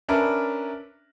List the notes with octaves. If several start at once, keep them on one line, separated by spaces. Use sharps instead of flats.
C#4 D4 A#4 B4 E5